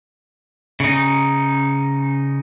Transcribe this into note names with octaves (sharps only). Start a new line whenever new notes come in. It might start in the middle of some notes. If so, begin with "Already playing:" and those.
C#3 D#4